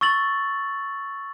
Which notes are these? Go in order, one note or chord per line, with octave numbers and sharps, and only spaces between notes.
C#6 E6 A6 F#7